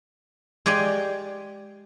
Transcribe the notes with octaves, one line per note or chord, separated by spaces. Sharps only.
G#3 G4 D5 G#5